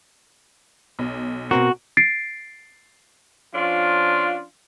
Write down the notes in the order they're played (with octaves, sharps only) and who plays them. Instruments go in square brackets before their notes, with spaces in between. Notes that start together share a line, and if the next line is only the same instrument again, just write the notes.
[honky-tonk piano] B1
[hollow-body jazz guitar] B2 C4 A#4 [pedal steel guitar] F#4
[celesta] A6 C7 D7
[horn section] F3 C#4 D4 F4